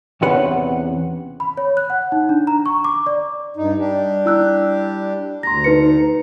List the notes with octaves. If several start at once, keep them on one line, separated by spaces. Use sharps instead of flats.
E2 C3 C#4 B4 F#5
B5
C#5
F#6
F#5
D#4
D4
A#5
C#6
D6
D5
G2 D#4
G3 D4 G4
E4 E6 F#6
D2 A#5 C6 A#6
D#4 B4 C#7